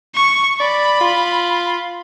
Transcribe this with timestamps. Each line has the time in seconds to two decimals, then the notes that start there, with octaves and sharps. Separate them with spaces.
0.15 C#6
0.60 D5 B5
1.01 F4